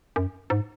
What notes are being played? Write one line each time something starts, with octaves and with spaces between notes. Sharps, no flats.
F#2
G#2